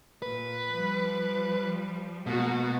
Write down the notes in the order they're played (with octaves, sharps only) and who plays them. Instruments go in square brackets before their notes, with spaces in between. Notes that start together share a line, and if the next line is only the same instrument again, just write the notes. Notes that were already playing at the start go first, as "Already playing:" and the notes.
[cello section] A#2 [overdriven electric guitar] B4
[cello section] F3 G3
[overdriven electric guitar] B2 [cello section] G#3 A#3 F#4